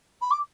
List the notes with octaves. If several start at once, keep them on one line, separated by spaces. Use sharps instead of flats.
B5
D6